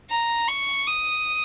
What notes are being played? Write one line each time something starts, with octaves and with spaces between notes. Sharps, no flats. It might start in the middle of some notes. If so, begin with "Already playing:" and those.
A#5
C#6
D#6